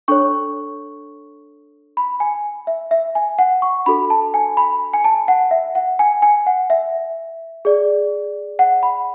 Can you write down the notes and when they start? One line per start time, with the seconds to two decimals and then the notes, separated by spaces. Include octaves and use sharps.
0.08 D4 A4 C#5 C#6
1.97 B5
2.20 G#5
2.67 E5
2.91 E5
3.15 G#5
3.39 F#5
3.62 C#6
3.86 D4 F#4 A4 B5
4.10 A5
4.34 G#5
4.57 B5
4.94 G#5
5.04 A5
5.28 F#5
5.51 E5
5.75 F#5
5.99 G#5
6.22 G#5
6.47 F#5
6.70 E5
7.65 G#4 D5
8.59 F#5
8.83 B5